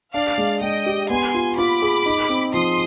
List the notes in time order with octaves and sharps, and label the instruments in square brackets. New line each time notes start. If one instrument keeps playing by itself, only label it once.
[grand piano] D4 [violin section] D5 F5
[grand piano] G#3
[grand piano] G#3 [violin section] D#5 G5
[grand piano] G4
[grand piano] B3 [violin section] G#5 C6
[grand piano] F4
[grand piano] F4 [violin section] B5 D6
[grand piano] G#4
D#4
C4
[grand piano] F3 [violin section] C6 D#6